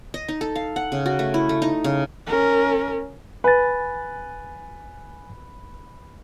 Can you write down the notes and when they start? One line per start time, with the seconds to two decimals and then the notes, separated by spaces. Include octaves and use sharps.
0.14 D#5
0.28 D#4
0.41 A4
0.56 F5
0.76 F#5
0.92 C#3
1.06 F#4
1.19 A3
1.34 E4
1.49 A3
1.62 D#4
1.84 C#3
2.27 C#4 A#4
3.44 B4 G#5 A6